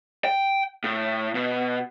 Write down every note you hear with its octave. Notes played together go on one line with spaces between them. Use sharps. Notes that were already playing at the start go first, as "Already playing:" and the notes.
G5
A2
B2